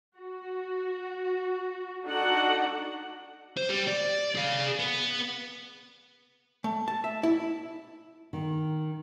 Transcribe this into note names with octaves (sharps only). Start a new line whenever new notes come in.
F#4
D4 D#4 F#4 A4 F#5
C5
G3
D5
G#4 F5
B3 B4
A3
A5
E5
E4
D#3